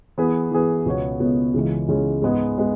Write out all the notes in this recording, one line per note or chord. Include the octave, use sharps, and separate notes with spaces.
E3 B3 G#4 B4
E3 B3 G#4 B4
C#2 B2 B3 F#4 C#5
C#2 B2 B3 F#4 C#5
C#2 C#3 E3 G#3 C#4
C#2 C#3 E3 G#3 C#4
G#2 G#3 B3 G#4
G#3 B3